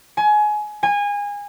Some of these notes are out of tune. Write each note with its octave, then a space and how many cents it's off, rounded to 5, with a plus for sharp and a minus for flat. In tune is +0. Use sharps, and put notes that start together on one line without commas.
G#5 +25
G#5 -25